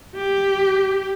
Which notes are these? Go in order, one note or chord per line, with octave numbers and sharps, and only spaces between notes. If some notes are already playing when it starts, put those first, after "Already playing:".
G4